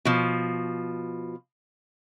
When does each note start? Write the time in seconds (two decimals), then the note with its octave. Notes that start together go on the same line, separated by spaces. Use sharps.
0.05 B2 F3